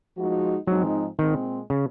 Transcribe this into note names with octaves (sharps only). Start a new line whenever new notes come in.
F3 G#3 D#4 F#4
G#2 F3 F#3 G#3 C4 D#4
A#2 D#3 G#3 C4
C#3